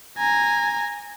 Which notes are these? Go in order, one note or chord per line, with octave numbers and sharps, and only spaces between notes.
G#5 A#5